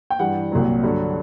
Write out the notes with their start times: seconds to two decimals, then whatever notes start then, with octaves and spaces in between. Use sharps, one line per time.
0.10 G5
0.19 G2 E3 G3 F#5
0.52 C2 A#2 F#3
0.83 G2 D3 F#3